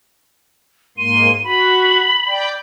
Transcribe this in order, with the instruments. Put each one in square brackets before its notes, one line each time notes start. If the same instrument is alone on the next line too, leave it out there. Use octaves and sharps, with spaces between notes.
[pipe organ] G#2 A#3 C6 [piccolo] D#7
[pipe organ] F#4 [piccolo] B5
[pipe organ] D5 G5